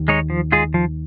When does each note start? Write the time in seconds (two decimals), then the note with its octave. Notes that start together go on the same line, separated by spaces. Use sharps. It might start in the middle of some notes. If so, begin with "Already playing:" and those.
Already playing: D#2 D#3
0.08 G#3 D#4 C#5
0.30 F3
0.52 G#3 F4 G#4
0.74 F3